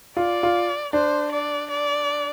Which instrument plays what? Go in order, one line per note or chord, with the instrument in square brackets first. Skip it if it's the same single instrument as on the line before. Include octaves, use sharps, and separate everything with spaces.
[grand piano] F4 [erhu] D5
[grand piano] F4
[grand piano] D4 [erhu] C5
[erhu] D5
D5